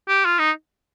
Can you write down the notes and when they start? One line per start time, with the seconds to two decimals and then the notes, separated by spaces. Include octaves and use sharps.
0.08 G4
0.25 F4
0.39 D#4